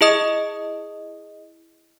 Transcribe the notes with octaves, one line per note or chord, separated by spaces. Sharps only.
E4 G#4 D#5 D#6